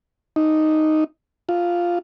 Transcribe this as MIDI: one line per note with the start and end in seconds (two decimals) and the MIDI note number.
0.36 1.04 63
1.49 1.99 65